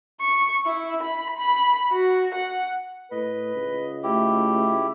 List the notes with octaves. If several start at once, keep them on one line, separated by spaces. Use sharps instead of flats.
C#6
E4
B5
B5
F#4
F#5
A2 B4 D#5
C#2
A3 E4 G4